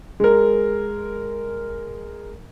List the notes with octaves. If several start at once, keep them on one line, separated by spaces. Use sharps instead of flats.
G#3 A#4